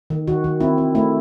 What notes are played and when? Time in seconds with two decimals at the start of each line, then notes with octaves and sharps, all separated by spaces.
0.10 D#3
0.27 D#3 F#4
0.44 D#3
0.60 C4 E4
0.78 C4
0.95 A3 E4